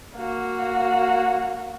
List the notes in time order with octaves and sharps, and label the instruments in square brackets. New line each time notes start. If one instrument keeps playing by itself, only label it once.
[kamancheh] A#3 F#4